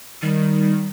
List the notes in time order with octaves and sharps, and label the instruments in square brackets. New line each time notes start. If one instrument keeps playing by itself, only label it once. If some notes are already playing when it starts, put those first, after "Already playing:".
[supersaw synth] D#3 [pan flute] G3